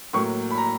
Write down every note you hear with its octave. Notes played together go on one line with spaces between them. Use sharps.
A2 F#3 A#3 C#6
B5
A#5